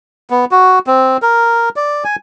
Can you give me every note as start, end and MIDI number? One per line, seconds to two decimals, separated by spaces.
0.30 0.45 59
0.51 0.79 66
0.87 1.17 60
1.22 1.69 70
1.76 2.04 74
2.04 2.16 80